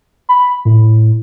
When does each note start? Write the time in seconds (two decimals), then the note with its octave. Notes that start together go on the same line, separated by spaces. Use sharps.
0.29 B5
0.65 A2